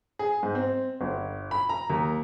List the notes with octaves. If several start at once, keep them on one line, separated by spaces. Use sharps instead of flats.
G#4
G#2
C4
G1
B5
A#5
D#2